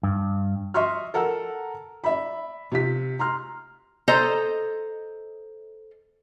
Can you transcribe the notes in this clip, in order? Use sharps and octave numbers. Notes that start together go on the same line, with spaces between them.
G2
D#5 E5 C6 C#6 F6
A4 A#4 F#5 A5 E6
D5 E5 B5
C3 F4 B6
A#5 C6 F6
A4 C5 D#5 A#5